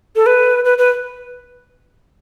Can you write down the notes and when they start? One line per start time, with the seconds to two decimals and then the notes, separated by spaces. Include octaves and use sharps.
0.16 A4
0.26 B4
0.65 B4
0.78 B4